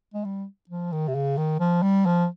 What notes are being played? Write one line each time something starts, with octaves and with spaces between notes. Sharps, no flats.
G#3
G3
F3
D#3
C3
C#3
D#3
F3
G3
F3